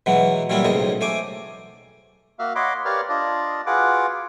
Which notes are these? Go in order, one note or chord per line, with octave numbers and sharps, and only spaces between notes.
B2 E3 F#3 G#3 B3
A#2 E3 F#3 G3 E4 F4
B1 A2 C#3 G#3 C5 D#5
A3 C5 G#5 D6
A#3 F#4 E5 F5
C#5 D#5 F#5 B5 C6 D6
G4 A#4 B4 C#5 D5 F5
D4 F4 D5 D#5
F4 F#4 G#4 B4 F#5 D6